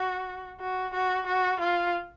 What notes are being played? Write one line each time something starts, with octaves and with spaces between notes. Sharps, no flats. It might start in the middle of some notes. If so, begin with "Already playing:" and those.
Already playing: F#4
F#4
F#4
F#4
F4